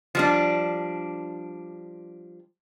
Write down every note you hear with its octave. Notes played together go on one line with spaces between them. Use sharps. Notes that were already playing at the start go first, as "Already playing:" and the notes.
F3 G3 D4